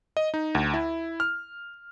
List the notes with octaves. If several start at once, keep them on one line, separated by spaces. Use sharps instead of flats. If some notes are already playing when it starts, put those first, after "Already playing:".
D#5
D#4
D2
E4
F6